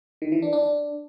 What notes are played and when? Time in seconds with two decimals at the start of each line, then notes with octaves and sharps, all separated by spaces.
0.22 D#3
0.32 E3
0.42 D4
0.53 D4
0.63 D4